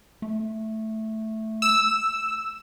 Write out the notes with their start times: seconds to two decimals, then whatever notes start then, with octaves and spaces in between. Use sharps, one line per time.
0.22 A3
1.62 E6